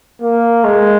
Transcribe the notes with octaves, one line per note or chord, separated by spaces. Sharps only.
A#3
G#3